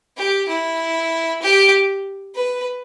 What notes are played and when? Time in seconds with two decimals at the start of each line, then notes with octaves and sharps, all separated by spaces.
0.17 G4
0.49 E4
1.42 G4
2.35 B4